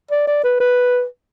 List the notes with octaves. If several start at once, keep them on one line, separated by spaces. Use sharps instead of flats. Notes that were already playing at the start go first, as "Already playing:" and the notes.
D5
D5
B4
B4